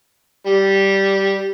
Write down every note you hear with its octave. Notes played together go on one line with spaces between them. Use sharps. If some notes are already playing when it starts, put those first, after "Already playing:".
G3